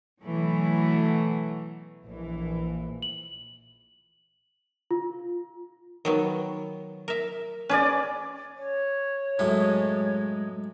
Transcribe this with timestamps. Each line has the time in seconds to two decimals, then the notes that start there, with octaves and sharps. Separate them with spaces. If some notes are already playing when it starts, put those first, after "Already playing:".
0.22 B2 E3 F#3 A3
2.04 A#1 E3
3.02 F#7
4.91 F4
6.05 D#3 F#3 B3
7.08 A#4 E5
7.69 C#4 G#4 B4 D5
8.56 C#5
9.39 F#2 A2 G#3 A3